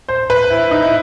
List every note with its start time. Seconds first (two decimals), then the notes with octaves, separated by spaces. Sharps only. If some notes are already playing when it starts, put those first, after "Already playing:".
0.08 C5
0.30 B4
0.50 E4
0.71 D#4
0.82 E4